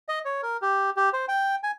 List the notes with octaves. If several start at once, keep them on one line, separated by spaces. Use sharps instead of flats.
D#5
C#5
A#4
G4
G4
C5
G5
G#5